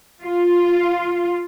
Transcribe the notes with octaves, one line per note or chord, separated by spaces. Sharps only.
F4